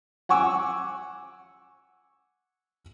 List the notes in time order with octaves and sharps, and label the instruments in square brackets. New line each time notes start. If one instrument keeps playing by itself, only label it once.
[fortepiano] F#5 G#5 C#6 D6 E6